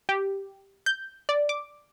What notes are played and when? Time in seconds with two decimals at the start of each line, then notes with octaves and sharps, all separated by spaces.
0.09 G4
0.86 G6
1.29 D5
1.49 D6